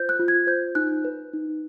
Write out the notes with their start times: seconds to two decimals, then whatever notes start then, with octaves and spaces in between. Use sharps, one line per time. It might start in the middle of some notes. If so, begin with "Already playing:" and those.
Already playing: F4 C5 G6
0.09 F#6
0.20 F4
0.28 G#6
0.47 C5 G6
0.75 D#4 F#6
1.05 B4
1.33 D#4